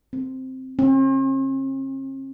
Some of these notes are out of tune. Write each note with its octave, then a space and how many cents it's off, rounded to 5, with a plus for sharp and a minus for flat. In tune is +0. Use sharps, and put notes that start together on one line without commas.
C4 -5
C4 +45